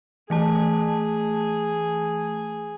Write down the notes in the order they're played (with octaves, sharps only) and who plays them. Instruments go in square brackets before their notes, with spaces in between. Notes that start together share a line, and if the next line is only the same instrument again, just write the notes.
[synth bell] E3 A3 A5 [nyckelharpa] G#4